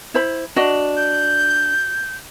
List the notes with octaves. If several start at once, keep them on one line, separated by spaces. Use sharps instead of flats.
E4 C5 B5
D4 F#4 D#5
G6